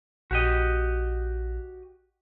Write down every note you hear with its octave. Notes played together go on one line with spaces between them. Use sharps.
A#1 F#4 G4 D#5